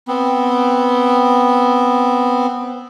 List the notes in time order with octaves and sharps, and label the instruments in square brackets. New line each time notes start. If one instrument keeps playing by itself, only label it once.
[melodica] B3 C4